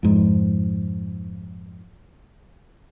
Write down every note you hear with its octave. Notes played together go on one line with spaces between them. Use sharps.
F2 G#2